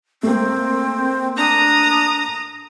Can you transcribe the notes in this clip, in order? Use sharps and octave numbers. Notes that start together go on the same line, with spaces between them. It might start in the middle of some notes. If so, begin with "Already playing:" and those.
A3 A#3 C4
D4 A#5 D#6